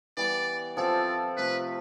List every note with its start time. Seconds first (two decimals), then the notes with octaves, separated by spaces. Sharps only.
0.17 E3 G3 B3 D5
0.77 F3 C4 F4 A4 D5
1.37 C3 F3 A3 B4